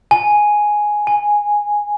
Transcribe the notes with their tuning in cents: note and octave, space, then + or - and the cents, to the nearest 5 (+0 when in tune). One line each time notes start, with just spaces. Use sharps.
G#5 +5
G#5 -5